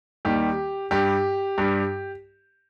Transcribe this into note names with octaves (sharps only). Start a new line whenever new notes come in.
D#2 D#3 G3 G4
G2 G3 G4
G2 G3